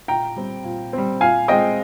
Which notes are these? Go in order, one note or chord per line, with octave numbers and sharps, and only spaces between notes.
A#2 G5 A#5
G3 C4
A#2
G3 C4
A#2 F5 G#5
G#3 C4 D#5 G5